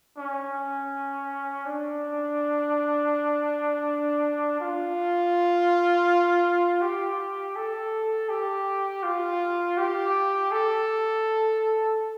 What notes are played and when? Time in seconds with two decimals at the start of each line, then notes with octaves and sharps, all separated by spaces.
0.17 C#4
1.65 D4
4.60 F4
6.81 G4
7.56 A4
8.29 G4
9.03 F4
9.77 G4
10.51 A4